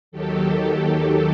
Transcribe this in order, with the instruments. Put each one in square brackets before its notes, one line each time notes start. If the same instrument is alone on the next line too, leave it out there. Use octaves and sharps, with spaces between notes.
[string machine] D#2 D#3 F#3 G4 A4